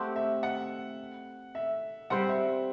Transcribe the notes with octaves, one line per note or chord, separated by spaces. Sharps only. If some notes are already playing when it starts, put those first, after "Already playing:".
Already playing: A3 C4 G4 F#5
E5
F#5
E5
G3 C4 G4 C5 F#5
E5